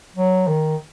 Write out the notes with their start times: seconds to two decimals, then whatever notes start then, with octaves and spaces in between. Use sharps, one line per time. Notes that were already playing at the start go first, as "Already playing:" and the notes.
0.16 F#3
0.47 D#3